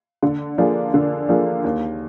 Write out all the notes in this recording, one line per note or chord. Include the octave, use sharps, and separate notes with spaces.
D3
F3 A#3 D4 G#4
D3
F3 A#3 D4 G#4
D#2